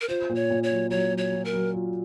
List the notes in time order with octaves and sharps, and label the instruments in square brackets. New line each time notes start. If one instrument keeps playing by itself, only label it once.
[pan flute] A#4
[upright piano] F4 [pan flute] C5
[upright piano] A#2
[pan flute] C#5
[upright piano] A#2
[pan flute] C#5
[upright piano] F#3
[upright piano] F#3 [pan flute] C#5
[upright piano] F#3
[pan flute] C#5
[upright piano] F#3
[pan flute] A#4
[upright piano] F#3
F4